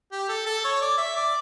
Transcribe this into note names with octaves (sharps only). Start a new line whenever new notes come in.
G4
A4
A4
C#5
D5
E5
D5